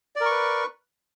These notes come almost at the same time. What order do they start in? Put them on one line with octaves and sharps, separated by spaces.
D5 A#4 C#6 B4